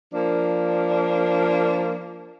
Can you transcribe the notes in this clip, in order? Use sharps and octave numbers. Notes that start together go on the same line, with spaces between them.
F3 A#3 D4